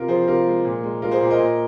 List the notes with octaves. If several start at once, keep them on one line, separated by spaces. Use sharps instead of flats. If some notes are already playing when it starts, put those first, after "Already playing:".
Already playing: C3 F4 A#4
F3 G#4 C5
C3 F4 A#4
G#3
A#2
G#3
G#3 F4 A#4
G#4 C5
A#2
A#4 D#5
A#2